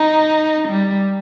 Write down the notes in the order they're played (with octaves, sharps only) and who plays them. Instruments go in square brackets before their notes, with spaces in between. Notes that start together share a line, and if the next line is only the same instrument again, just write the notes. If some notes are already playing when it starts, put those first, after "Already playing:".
Already playing: [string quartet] D#4
G3